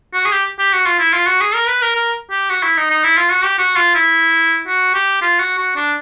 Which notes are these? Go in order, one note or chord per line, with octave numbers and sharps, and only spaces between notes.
F#4
G#4
G4
G4
F#4
F4
E4
F4
F#4
G#4
A#4
B4
A#4
A#4
G4
F#4
E4
D#4
D#4
E4
F4
F#4
G4
F#4
F4
E4
F#4
G4
F4
F#4
F#4
D4